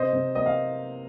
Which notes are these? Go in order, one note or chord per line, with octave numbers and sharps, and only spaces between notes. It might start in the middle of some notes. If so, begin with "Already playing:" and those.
Already playing: C3 C5 D#5
C3
A#3 D#5
F5